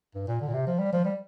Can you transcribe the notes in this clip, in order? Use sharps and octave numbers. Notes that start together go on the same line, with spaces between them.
G2
A#2
D3
A#2
C3
F3
G3
F3
G3